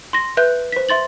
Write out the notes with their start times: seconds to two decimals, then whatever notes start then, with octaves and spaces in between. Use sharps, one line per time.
0.13 C6 A#6
0.37 B4 E5 F#6 G6
0.72 C5 B6
0.89 E5 C6 A6 F#7